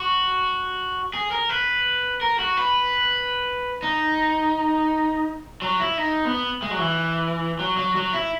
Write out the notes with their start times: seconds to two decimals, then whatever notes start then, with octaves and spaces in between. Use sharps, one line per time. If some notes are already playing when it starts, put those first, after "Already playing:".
Already playing: F#4
1.14 G#4
1.31 A#4
1.49 B4
2.21 A#4
2.39 F#4
2.57 B4
3.83 D#4
5.62 F#3
5.80 E4
5.98 D#4
6.25 B3
6.62 G#3
6.71 F#3
6.79 E3
7.59 F#3
7.77 F#3
7.95 F#3
8.13 E4